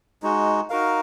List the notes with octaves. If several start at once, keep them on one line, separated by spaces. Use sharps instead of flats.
G#3 D#4 F#4
D#4 F#4 A#4 F5